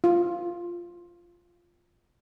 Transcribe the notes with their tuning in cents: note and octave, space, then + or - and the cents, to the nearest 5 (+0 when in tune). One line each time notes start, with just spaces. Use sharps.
F4 -5